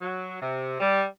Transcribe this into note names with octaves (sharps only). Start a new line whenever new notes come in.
F#3
C3
G3